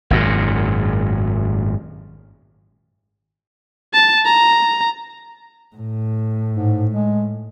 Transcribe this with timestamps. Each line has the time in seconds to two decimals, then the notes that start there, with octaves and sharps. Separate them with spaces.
0.10 G#1 F#2 A#2
3.93 A5
4.25 A#5
5.76 A2
6.53 G#2
6.91 G#3